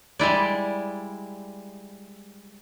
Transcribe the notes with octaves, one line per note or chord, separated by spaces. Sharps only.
G3 G#3 E4 D5